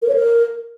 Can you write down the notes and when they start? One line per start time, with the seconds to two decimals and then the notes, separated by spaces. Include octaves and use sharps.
0.02 A#4
0.09 C#5
0.15 A#4